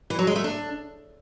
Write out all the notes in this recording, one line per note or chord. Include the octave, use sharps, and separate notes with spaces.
E3
F#3
G#3
A3
D4